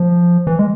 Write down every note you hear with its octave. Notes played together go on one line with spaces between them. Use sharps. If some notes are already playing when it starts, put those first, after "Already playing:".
Already playing: F3
E3
G#3